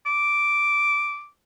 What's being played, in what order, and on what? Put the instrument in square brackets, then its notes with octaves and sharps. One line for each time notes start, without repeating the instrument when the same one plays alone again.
[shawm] D6